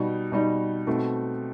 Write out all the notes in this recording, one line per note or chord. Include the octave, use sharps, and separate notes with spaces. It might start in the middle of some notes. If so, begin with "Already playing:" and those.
Already playing: B2 G3 D#4
B2 G3 D#4
B2 A3 C4 D#4